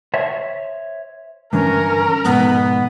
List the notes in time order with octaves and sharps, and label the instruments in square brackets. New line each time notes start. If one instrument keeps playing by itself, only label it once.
[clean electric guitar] C5 C#5 E5
[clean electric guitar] G2 D3 E3 [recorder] C#4 [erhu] A#4
[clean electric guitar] F2 G#2 B2 [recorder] B3